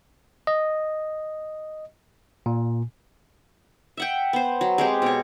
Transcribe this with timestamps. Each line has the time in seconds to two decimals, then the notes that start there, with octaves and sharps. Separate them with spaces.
0.47 D#5
2.46 A#2
3.97 E5 F#5 G5
4.33 B3 C5
4.61 F#3
4.78 G#3 C4 G4
5.02 B2 C#5